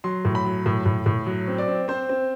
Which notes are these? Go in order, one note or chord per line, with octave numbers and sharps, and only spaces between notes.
F#3 C6
A2
B5
F#3
A2
A2
A2
F#3
C4
D5
C4
C4 C5
C4